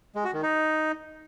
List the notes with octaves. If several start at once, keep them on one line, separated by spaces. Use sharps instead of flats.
G#3
F#4
D#3
D#4